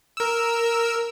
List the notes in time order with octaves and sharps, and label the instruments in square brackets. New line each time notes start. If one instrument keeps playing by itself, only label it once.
[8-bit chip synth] A#4 E6